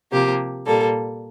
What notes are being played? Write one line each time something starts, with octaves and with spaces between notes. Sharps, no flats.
C3 F3 A#3 G4
A#2 G3 A#3 A4